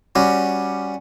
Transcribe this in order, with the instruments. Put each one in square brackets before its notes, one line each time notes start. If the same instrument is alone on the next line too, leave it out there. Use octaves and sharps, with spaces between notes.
[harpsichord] G3 C#4 F#4